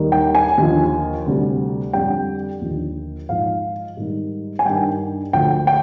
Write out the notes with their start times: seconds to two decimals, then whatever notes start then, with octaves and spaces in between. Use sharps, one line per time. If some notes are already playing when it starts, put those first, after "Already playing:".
Already playing: D#2 D#3 G3
0.12 G5
0.35 G#5
0.58 D#2 D3 F3
1.26 D2 C3 G3
1.93 F2 D3 G3 G5
2.61 D#2 D3 F3
3.29 G#2 F3 F5
3.97 G#2 D#3 G3
4.59 G#5
4.65 G2 D#3 G3 G5
5.33 D2 D3 F3 G5
5.67 G5